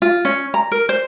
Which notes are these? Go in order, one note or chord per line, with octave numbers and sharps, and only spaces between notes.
F4
C#4
A#5
A#4
C5